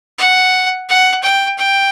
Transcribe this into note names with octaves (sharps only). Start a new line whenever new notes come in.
F#5
F#5
G5
G5